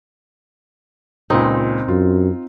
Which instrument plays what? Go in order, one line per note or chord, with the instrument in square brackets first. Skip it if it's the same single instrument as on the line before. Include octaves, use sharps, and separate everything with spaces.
[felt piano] C#2 A#2 C#3 [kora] C4 D#4
[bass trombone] F#2 [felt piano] F4